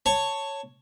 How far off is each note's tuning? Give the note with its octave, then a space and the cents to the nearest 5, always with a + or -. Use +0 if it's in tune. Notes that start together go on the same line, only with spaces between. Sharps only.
C#5 +0 A5 +15